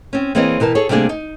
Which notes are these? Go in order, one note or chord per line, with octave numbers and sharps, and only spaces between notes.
C4 C#4
E3 A#3 C4 G#4 C#5 D#5
B2 E3 A#4 A5
G#4 A4 C#5
C3 G3 A3 A#3 D4 G#4
D#4